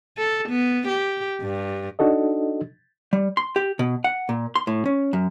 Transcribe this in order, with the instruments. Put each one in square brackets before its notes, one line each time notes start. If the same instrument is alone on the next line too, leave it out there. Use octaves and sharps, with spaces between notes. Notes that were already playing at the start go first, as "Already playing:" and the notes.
[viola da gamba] A4
B3
G4
G2
[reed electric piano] D4 D#4 F#4 A4 D#5
[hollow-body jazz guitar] G3
C6
G4
B2
F#5
A#2
C6
A2
C#4
F#2